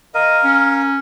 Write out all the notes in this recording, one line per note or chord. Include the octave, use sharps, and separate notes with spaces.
A#4 D#5 F5
C#4